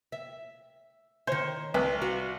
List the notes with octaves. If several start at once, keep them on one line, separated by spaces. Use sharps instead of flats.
E5
D#3 C5 C#5
C2 B4
F#4 F5